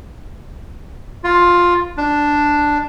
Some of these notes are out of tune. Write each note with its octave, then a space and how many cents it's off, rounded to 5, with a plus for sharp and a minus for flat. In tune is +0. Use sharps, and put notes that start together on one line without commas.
F4 +10
D4 +0